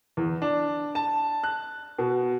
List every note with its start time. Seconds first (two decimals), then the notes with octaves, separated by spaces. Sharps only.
0.17 E2
0.42 D4
0.95 A5
1.44 F#6
1.99 B2